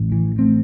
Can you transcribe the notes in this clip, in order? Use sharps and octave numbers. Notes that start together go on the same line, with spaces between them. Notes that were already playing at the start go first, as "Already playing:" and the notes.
Already playing: A1 A2
E3
A3 C4